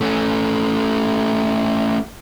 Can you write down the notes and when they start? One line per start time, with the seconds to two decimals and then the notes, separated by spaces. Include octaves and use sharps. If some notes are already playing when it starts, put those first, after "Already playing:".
0.01 A3 C#4